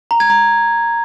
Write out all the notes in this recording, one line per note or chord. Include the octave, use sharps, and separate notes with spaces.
A#5
G#6
A#5